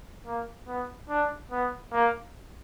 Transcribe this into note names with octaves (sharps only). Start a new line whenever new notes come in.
A#3
B3
D4
B3
A#3